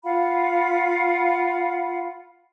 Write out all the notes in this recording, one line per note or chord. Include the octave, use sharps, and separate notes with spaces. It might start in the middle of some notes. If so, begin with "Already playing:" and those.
F4 F5 F#5 B5